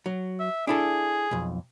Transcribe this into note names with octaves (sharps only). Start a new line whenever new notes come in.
F#3
E5
D4 E4 G#4 A4
B1 F2